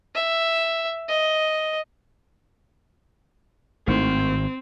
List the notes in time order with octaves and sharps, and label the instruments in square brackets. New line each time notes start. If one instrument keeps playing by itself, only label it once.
[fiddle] E5
D#5
[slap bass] G#1 [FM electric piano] A2 D#3 C#6 [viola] C4